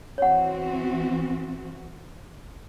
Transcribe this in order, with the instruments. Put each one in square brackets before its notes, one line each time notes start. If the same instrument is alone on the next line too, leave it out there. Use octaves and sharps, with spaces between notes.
[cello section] E3 C4 F#4 [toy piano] C#5 F#5